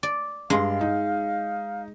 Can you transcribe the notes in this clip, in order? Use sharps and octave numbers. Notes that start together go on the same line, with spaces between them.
D5
G2 G#3 F5 C6
D#4